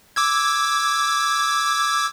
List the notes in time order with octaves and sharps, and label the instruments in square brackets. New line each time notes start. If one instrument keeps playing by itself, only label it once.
[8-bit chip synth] D6 E6 G#6